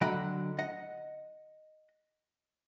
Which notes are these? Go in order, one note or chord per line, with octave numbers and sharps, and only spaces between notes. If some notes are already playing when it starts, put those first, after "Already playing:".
D3 F#3 D#5 F#5 G5 B5
D#5 F#5